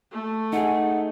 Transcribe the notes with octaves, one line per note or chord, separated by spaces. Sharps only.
A3
D#4 G#4 F#5